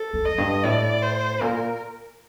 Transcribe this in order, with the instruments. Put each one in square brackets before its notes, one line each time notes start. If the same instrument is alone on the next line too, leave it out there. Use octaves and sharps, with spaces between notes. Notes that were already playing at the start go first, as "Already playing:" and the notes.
Already playing: [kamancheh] A4
[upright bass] F2
[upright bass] F2 [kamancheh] D#5
[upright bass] G2
[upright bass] A2 [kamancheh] D5
[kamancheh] C5
[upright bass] A#2 [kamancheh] A#4